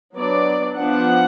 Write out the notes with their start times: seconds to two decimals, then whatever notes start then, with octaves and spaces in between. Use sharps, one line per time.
0.16 F#3 B3 D4 D5
0.79 F3 B3 D4 F#5